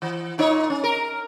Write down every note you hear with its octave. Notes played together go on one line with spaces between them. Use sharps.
E3
A#2 D#4 C#5
C#4
A#4